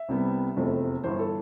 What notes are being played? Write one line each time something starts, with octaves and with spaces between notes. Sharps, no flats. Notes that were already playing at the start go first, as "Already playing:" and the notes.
Already playing: E5
C2 C3 G3 B3
F1 E2 C3 F3 A3
G1 G2 E3 C5
A4